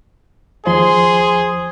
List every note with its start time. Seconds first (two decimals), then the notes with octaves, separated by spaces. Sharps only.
0.66 D#2 F3 G#4 C5 C6